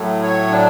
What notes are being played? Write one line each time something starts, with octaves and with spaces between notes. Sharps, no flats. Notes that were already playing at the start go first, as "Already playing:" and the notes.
Already playing: A2 F#3 A3
C#5
D4